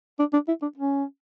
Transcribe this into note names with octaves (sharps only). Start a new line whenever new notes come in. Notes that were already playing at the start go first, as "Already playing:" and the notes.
D4
D4
E4
D4
C#4